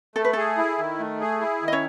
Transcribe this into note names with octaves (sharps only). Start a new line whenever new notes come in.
A3 A4
B4
G#4 A4
E4
D#3
A3
G#4
E4
D#3
D#5
C#4 C#5